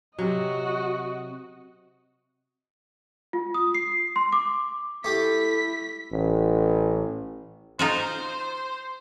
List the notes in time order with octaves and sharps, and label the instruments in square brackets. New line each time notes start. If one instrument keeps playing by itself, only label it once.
[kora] C3 F#3 [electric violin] F#4 D#5
[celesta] F4
D#6
C7
C6
D6
[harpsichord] A3 G4 [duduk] E4 [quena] A4 [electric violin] B6
[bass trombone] A1
[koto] D#4 F4 F#4 [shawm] C5